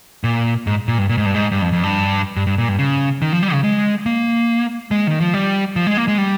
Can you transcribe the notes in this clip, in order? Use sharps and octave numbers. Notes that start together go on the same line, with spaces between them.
A#2
G#2
A#2
G2
A#2
G#2
G2
G#2
G2
F2
F2
G2
G2
G2
A#2
G2
C#3
D#3
F3
G3
C#3
G#3
A#3
G#3
D#3
F3
G3
F3
G#3
A#3
G#3
G3